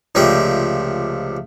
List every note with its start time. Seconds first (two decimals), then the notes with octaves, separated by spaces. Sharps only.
0.15 C#2 C3 F3 A3 D4 G5